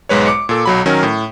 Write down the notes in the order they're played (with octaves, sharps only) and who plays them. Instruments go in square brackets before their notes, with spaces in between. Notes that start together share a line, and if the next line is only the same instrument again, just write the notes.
[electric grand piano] B1 G#2 G#3 B4 C#5
D6 C#7
A#2 A4 D6
B1 F#3 B5
D#3 F#3 C#4 A#4
A2